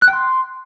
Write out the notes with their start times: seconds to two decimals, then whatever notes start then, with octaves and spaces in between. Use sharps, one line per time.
0.02 F#6
0.08 G5
0.13 C6